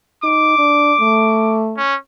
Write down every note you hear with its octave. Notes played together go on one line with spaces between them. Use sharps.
D#4 D6
D4
A3
C#4